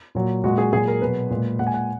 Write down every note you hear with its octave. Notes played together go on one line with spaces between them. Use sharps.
A#2 F#3
A#2 G#3 F#4
G#4
A#2 F#3 G#4
A#4
B2 F#3 B4
A#2 G#3
A#2 G#3 F#5
G#5
F#5